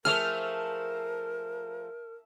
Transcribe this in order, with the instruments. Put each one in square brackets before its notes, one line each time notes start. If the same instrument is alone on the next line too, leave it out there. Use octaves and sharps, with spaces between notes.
[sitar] F3 A3 G#4 [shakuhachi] A#4 [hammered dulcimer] E5 A5 [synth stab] F6